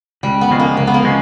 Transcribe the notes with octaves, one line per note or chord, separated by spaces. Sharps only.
C#2 G3
B3
C#3 F3 G#3
A#3
C#2 A#3
B3
A#3
C#3 F3 G#3